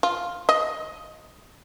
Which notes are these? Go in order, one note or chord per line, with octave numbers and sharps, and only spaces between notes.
F4
D#5